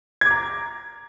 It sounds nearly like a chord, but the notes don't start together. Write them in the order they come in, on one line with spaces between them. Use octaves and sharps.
G#6 D6 A#5